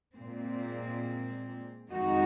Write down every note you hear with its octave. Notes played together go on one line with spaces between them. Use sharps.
A#2 G#3 C4
F2 D#3 G#3 D#4 F#4